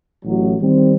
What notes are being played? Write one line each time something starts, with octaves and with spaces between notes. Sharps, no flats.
A1 F#3
D#3 G3 C4